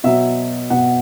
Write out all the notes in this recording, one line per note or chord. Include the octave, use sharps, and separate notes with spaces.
B2 F#3 E5
B2 F#3 F#5